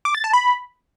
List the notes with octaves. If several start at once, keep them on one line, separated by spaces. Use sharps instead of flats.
D6
A6
A5
B5